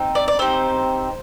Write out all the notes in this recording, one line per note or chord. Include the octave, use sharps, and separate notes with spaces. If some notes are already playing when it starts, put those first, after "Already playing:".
Already playing: C4 D#4
D5
D5
C4 D#4 G4 C5